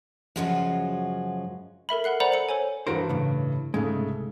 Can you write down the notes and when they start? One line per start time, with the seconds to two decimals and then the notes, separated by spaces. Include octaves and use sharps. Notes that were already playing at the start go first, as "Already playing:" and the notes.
0.36 F#2 C#3 F3 G#3 F4 F#4
1.89 A4 A#4 E5 B5
2.04 A4 A#4 F#5 F#6 C7
2.20 C5 D5 F#5 A#5 B5
2.32 A4 C#7 F#7
2.49 A4 C5 C#5 G#5
2.87 G2 E3 F#4 A#4 C5 D7
3.09 A2 C#3
3.74 C2 G#2 C#3 G#3 A3